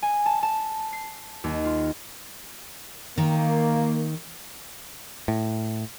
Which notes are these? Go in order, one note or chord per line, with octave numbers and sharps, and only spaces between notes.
G#5
A5
A5
C7
D#2
F4
D#3 A#3
A2